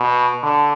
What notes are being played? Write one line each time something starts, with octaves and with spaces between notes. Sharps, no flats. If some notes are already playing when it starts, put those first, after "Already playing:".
Already playing: B2
D3